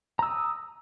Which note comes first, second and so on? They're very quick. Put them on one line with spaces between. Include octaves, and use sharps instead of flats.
A#5 E6 D#6